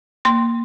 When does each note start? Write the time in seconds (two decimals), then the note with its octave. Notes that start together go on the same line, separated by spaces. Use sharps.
0.25 A#3 C6